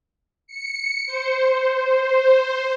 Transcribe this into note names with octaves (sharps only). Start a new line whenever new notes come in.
C#7
C5